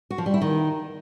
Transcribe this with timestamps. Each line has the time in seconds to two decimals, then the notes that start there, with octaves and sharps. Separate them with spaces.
0.11 F#4
0.18 F3
0.26 G3
0.34 E4
0.41 D#3